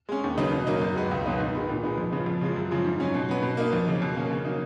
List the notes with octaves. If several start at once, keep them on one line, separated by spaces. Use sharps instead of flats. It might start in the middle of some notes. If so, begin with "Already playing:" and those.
G#3 C#4
D#2
C#3 F#3 B3 D#4
B2
F#3 A#3 D#4
F#2
D#3 G#3 B3
C#2
B2 F#3 B3 D#4
G#2
D#3 G#3 B3
A#2
G#3 B3 D#4
F2
C#3 F3 B3
F2
C#3 F3 G#3
F#2
C#3 F3 G#3
G#2
F#3 C#4
B2
F#3 B3
B2
A#3 D#4
F2
C#3 F#3
B2
A#3 C#4
C#3
F#3 A#3 D#4